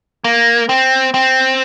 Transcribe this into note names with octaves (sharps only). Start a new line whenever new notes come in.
A#3
C4
C4